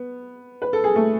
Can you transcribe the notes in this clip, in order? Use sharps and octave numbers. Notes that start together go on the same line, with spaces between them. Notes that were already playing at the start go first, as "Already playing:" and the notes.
Already playing: B3
B4
A4
G#4
A3 A4